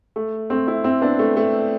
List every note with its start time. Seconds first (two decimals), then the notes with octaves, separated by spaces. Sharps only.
0.16 A3
0.50 A3 C4
0.67 C4 E4
0.84 C4 E4
1.01 B3 D4
1.19 A3
1.37 A3